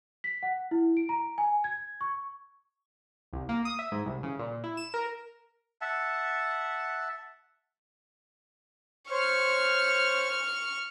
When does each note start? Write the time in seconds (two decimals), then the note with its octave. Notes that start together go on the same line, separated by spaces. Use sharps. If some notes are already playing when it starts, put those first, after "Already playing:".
0.24 B6
0.43 F#5
0.71 E4
0.97 D7
1.09 A#5
1.38 G#5
1.64 G#6
2.01 C#6
3.33 C2
3.49 A#3
3.65 D#6
3.79 E5
3.92 G#2
4.06 C2
4.23 C#3
4.39 A#2
4.64 E4
4.77 E7
4.94 A#4
5.81 E5 F#5 A5
9.10 C5 C#5 C#6 F6